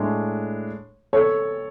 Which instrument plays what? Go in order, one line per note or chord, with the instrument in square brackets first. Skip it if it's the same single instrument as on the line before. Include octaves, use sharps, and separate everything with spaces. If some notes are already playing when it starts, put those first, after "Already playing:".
Already playing: [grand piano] A2 G#3 D4
[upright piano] A4 C#5